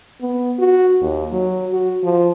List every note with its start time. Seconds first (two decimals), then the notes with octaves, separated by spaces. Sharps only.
0.21 B3
0.59 F#4
1.02 D#2
1.32 F#3
1.73 F#4
2.03 F3